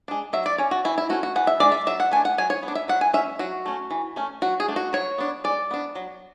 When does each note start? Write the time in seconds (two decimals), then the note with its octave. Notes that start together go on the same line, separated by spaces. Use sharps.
0.08 G#3 D4
0.33 F#3 E5
0.46 D5
0.58 C#4 C#5
0.71 F#4
0.85 E3 E4
0.98 E4
1.09 A3 C#4 F#4
1.23 F#4
1.36 E3 F#5
1.47 E5
1.60 G#3 D4 D5
1.72 E5
1.87 F#3 E5
2.00 F#5
2.11 A3 D4 G#5
2.25 F#5
2.38 F#3 G#5
2.50 C#5
2.63 B3
2.68 D4
2.75 E5
2.88 F#3 F#5
3.01 G#5
3.14 C#4 E5
3.39 F#3 F#4
3.66 A3 C#4
3.91 E3
4.16 A3 C#4
4.42 F#3 F#4
4.60 G#4
4.68 A3 D4
4.76 F#4
4.93 F#3 C#5
5.18 B3 D4
5.44 G#3 D5
5.71 B3 D4
5.96 F#3